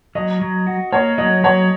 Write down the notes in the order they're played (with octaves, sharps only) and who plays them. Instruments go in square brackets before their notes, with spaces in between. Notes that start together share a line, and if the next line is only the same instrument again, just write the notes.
[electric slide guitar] F#3 [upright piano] D#5
[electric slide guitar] F#3
F#4
[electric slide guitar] A#3 [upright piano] C#5
[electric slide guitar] F#3 [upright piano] D#5
[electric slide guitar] F#3 [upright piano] C#5